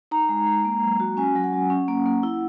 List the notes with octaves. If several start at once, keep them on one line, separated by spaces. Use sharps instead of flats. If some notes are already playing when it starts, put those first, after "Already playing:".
D#4 A#5
G#3
G#3
A#3
F#3
F#4
C#4 G#5
F#3
F#5
F#3
C#4
A#3
A#3
E4